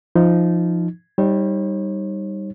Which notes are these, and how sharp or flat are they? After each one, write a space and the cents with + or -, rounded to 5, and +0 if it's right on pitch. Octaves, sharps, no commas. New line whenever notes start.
F3 -10 D#4 +0
G3 +0 D#4 +0 C#5 -45